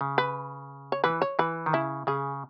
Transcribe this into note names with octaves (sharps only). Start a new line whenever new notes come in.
C#3
B4
C#5
E3 B4
C#5
E3 B4
D#3
C#3 E4
C#3 G#4